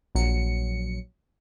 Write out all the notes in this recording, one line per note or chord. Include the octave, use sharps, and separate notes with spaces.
A#1 F#3 C#7